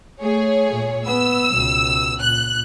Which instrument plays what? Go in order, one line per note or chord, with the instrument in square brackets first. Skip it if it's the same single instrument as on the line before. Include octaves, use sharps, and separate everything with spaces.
[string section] A3 G#4 C#5
[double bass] A#2
[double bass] B3 [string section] E6
[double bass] C#2 B2
[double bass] A#2 [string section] F#6